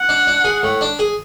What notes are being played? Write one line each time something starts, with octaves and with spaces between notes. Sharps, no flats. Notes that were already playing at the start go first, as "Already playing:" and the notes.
Already playing: F#5
D4
D4
G#4
A2
D4
G#4